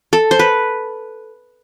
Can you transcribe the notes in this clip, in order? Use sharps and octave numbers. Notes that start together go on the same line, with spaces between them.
A4
C5
B4